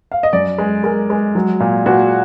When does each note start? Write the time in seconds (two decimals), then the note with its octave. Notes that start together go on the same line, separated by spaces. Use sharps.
0.12 F5
0.23 D#5
0.33 F#2 D5
0.58 G#3
0.84 G#3 A#4
1.10 G#3
1.35 F#3
1.60 A#2
1.86 A#2 F#4